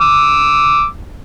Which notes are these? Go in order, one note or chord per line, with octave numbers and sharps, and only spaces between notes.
D6 E6